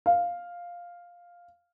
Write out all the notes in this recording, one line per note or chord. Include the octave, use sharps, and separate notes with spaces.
F5